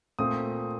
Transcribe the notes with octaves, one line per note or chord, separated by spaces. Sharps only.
A#2 A3 C4 D#6